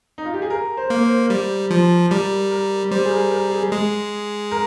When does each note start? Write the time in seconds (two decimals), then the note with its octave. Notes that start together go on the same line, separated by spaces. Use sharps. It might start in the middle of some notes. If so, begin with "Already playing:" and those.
0.18 D#4
0.25 F4
0.34 G4
0.42 G#4
0.50 A#4
0.77 C5
0.90 A#3
1.03 C5
1.30 G3
1.71 F3
2.11 G3 A#4
2.51 A#4
2.91 G3 C5
3.05 G#4
3.11 A#4
3.31 A#4
3.51 G#4
3.72 G#3
4.51 A#4